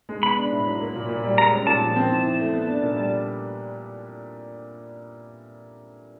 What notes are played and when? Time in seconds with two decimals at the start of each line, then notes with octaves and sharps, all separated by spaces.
0.09 G#3
0.23 B3 B5
0.37 D4
0.52 A2
0.67 F#3
0.81 A#3
0.95 A#2
1.09 A#2
1.24 G3
1.38 G#3 A#5
1.53 C#4
1.67 A#2 A5
1.81 F3
1.96 C4
2.10 E3
2.24 E3
2.39 A3
2.53 B3
2.67 D4
2.82 A#2
2.96 G3